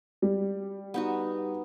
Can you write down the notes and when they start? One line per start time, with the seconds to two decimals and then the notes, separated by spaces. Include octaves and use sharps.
0.22 G3
0.94 B3 D#4 F#4